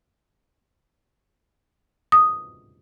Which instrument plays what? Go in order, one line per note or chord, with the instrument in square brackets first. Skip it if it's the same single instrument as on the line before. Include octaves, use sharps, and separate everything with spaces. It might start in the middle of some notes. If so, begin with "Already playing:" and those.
[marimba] D#6